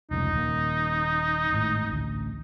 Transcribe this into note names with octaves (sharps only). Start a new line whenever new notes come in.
F1 C#2 D3 D#4
D#1 A#3
G#1 A2
A1 D2